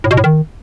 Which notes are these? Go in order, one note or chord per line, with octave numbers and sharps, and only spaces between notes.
A2
B2
A2
D#3